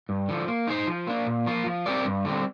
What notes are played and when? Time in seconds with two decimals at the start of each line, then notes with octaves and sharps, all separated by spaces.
0.09 G2
0.28 D3 F3
0.48 A#3
0.67 D#4 G#4 C5
0.87 F3
1.07 A#3 D4
1.26 A#2
1.46 F3 A#3 F4
1.66 F3
1.86 C4 G4 A#4 D5
2.05 G2
2.25 D3 G3 C4